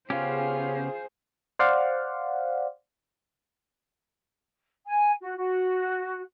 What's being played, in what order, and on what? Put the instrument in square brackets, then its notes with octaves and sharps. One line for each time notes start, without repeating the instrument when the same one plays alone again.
[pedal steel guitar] C#3 B3 G4 [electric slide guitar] C#4 [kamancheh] F4 [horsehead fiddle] G#4 C5
[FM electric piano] C5 D5 F5 F#5
[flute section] G#5
F#4
F#4